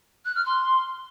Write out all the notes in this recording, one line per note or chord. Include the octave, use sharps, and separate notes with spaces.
F#6
F6
C6